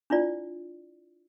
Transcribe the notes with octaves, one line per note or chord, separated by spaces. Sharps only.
D4 E4 F4 D5